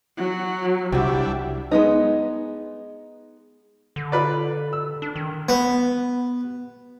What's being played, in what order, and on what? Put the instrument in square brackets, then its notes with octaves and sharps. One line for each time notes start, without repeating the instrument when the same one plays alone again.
[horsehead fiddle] F#3 [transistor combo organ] F#5
[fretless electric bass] C2 [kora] C3 F#4 [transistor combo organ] G3 D4 E4
[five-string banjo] G#3 B3 D#4
[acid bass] D3
[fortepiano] F4 B4 D5
E6
[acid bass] D4
D#3
[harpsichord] B3